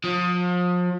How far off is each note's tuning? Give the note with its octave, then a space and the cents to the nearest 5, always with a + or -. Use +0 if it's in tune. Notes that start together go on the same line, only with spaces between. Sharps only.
F3 +35